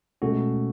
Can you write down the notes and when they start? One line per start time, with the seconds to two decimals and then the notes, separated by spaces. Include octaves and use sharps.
0.22 B2 G#3 A3 C#4 F#4